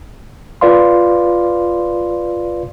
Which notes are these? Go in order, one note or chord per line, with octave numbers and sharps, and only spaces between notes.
F4 B4 D5 F5 C6